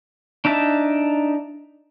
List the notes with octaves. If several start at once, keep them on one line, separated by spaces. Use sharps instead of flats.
D4 D#4 E5 A5